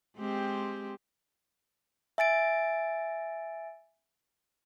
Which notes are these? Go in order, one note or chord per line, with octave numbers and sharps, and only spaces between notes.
G#3 C4 G4
E5 G#5 A6 D7